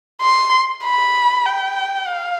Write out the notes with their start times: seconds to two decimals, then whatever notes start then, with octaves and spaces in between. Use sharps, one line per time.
0.22 C6
0.84 B5
1.46 G5
2.07 F5